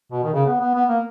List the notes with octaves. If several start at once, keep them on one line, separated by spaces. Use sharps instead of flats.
B2
D#3
C#3
B3
B3
B3
A#3